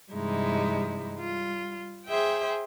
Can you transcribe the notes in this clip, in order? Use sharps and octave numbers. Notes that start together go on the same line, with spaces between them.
G2 C3 E3 G#3 D#4 E4
G3 F4
G#4 C5 E5 G5